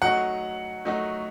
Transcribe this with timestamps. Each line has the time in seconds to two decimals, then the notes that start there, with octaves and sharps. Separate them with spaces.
0.02 F#3 A3 D#4 F#4 F#5
0.85 F#3 A3 D#4 F#4